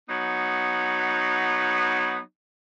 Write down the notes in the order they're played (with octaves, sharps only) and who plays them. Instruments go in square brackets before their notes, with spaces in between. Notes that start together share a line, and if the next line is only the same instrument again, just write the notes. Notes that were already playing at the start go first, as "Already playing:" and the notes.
[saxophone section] F#3 B3 D#4